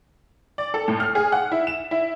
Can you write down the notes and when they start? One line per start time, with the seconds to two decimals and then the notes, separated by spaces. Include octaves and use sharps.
0.58 D5
0.74 A4
0.88 A2
1.00 F6
1.15 G#4
1.32 F#5
1.52 E4
1.67 E7
1.91 E4